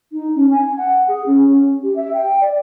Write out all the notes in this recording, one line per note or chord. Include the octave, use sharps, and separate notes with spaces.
D#4
C#4
G#5
F#5
G#4
C#4
G4
E5
G5
D5